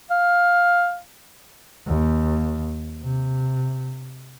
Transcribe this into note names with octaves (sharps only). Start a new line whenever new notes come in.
F5
D#2
C3